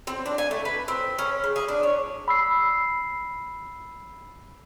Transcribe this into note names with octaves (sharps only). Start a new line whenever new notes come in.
C4
D4
G#5
A3
B4
C4
C#4
C#3
G#4
D4
C#5
B5 E6 C7